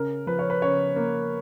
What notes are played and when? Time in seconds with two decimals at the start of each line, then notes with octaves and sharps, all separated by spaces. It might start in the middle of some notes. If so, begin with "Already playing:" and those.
Already playing: C#3 A#4
0.27 F3 B4
0.39 C#5
0.50 B4
0.61 C#3 C#5
0.96 A#3